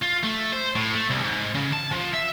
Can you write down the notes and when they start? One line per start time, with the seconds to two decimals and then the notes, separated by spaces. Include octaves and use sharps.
0.03 F4
0.24 A3
0.53 C5
0.76 A2
0.95 A3
1.10 C2
1.23 G#2
1.55 C#3
1.73 A5
1.92 F3
2.14 E5